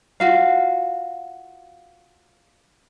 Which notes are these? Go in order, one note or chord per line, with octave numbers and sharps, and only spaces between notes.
F4 F#4 F5